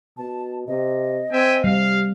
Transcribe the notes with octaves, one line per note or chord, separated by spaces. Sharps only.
B2 A5
C3 D#5
C4 E5 G5 G#5
C3 G3 F5